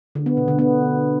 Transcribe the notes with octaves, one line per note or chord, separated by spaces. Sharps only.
D3
B3
B2
D3
B3